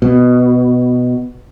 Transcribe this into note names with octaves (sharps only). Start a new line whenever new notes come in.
B2